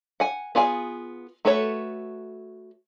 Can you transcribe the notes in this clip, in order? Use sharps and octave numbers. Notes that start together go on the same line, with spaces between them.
F#5 G#5
B3 F4 G#4 G5 G#5
A3 F#4 A4 B4 C#5